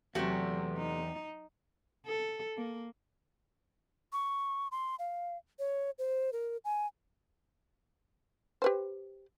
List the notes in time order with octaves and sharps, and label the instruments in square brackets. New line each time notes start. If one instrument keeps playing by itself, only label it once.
[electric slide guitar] E2 [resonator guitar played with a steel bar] C3 A3 [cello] F#3 [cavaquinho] F#4 G4
[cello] D#4
[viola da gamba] A4
A#3
[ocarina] C#6
C6
F5
C#5
C5
A#4
G#5
[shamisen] G4 B4 C5